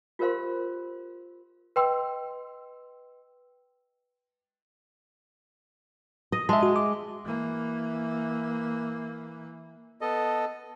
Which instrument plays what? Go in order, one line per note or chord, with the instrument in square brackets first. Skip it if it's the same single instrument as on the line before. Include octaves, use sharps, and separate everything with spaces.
[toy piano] F4 G4 A#4 C5 F5 C6
[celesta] B4 D#5 G5 C6 E6
[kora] D#5
[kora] G#3 [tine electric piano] E5 A5
[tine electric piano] F#4
D6
[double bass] E3 A#3
[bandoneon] B3 A4 D#5